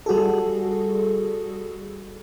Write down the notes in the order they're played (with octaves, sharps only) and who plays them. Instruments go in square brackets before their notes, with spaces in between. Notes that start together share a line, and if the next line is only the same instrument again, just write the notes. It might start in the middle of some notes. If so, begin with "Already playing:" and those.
[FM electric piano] G3 F#4 G#4 A4